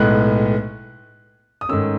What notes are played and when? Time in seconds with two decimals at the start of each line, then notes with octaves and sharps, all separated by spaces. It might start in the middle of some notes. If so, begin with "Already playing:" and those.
Already playing: B1 A2 G#3 B3 F#6
1.61 D#6
1.69 G#2 D#3 A3 C#4 E6